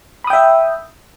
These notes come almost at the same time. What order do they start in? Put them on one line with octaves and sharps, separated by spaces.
B5 D#6 G5 E5